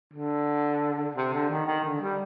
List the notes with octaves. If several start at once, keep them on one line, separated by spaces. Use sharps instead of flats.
D3
C3
D3
D#3
D#3
D3
G3